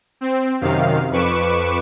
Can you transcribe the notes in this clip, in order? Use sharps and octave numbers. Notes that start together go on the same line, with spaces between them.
C4
F#2 C3 D#3 F5
F2 B4 C#6 D6 E7